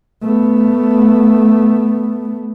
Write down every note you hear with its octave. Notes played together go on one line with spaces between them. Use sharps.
A3 B3